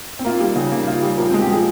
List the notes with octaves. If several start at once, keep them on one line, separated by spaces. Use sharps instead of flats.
C4
A#3 F4
G3
C#3
A#3
F4
G3
F3 A#3
C4
G#3
G4
F3 G#4